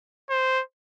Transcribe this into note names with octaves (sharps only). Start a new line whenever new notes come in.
C5